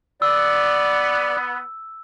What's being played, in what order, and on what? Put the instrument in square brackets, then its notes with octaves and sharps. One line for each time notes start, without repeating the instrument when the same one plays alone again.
[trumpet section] B3 [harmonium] D5 [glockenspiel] E6